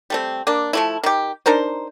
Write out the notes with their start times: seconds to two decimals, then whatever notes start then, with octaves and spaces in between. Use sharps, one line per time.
0.10 G3 A3 C4
0.47 A#3 D4
0.73 F3 A3 E4
1.04 D#3 G4
1.46 D4 D#4 A#4 C5